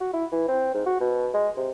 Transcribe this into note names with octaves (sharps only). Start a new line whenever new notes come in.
F#4
E4
E3
C4
G#2
F#4
B2
G#3
C3